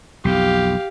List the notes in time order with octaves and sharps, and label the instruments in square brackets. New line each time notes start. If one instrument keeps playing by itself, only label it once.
[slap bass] B1 F2 [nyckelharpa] G4 F5